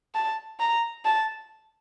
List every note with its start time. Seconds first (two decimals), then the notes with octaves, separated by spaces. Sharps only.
0.15 A5
0.60 A#5
1.05 A5